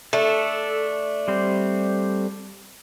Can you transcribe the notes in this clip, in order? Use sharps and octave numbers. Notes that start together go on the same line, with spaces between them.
A3 D4 A4
G3 C4 C5